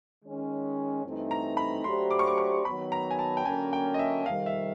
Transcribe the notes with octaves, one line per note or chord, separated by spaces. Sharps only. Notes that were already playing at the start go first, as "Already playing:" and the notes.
D#3 G#3 C#4
G2 E3 A3 C4 D#4
A#5
B5
F#3 A3 D4 G4 C5 C6
D6
C#6
D6
C#6
D#3 F#3 B3 B5
A#5
G#5
A5
G5
D3 F#3 A#3 C#4 G#5
G5
D#5
E5
F2 C3 D#3 G3 F5
E5